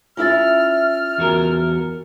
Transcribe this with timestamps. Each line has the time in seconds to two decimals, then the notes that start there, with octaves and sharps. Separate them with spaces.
0.17 C#4 E4 F4 E5 E6 F6 A6
1.18 E2 F#4 A#4